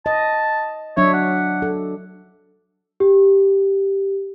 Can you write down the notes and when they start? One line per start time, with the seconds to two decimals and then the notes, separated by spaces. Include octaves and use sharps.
0.06 D#5 A5
0.97 F#3 D4 C#5 E5
1.13 F#5
1.62 A4
3.00 G4